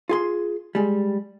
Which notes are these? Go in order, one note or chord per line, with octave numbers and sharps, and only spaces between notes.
F4 G#4 C6
G3 G#3